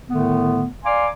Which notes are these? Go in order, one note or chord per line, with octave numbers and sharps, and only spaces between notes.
A2 D3 D#3 A3 B3
D5 F5 G#5 A#5 C6 D6